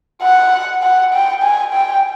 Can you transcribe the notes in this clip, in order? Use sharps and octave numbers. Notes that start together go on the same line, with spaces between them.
F#5
F#5
G5
G#5
G5